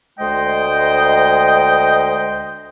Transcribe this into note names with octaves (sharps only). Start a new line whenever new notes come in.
D2 G#3 C5 D#5 G5